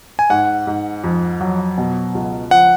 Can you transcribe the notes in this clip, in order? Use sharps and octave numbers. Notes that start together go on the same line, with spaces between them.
G#5
G#2 F#5
G#2
F2
F#3
B2
C#2
F3 F#5